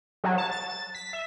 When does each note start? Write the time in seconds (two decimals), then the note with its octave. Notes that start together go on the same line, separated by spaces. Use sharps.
0.24 F#3
0.38 A5
0.51 A6
0.95 B6
1.13 E5